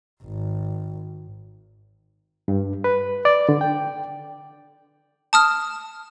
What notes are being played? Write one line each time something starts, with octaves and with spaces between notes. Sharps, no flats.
G#1
G2
B4
D5
D3
G5
A5 D#6 F6